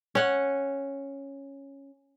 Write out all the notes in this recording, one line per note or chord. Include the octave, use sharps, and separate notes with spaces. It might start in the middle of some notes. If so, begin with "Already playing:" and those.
C#4 F#5